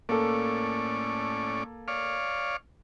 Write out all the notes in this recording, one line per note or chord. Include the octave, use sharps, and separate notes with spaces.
A2 A#3 C#4 A4 D5
C#5 D5 F5